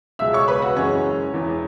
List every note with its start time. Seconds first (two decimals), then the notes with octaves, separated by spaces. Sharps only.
0.19 C#2 B2 G#3 E5 E6
0.33 C#5 C#6
0.48 B4 B5
0.62 F#4 F#5
0.76 F#1 F#2 E3 G#3 C#4 C#5
1.33 E1 E2 E3